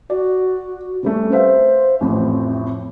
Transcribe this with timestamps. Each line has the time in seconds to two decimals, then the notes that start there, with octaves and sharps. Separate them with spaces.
0.10 F#4 D5
1.03 C3 G3 A3 C#4
1.32 B4 C5 E5 F5
2.01 A1 F2 A2 C4